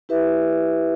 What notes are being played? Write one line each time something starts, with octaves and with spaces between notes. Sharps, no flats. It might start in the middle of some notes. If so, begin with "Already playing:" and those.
E4 G4 B4 E5